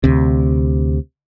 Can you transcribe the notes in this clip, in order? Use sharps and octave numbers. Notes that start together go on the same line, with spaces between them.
D2 C3